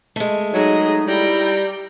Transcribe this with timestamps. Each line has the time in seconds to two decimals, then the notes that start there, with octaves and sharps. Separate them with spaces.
0.16 G#3 A3
0.53 F#3 D#4 G#4 D#5
1.07 G3 E4 G5 A#5